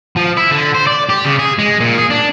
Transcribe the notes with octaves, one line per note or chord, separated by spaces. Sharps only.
F3
E4
D3
C5
D5
G4
C#3
G#4
G#3
A#2
G#4
D4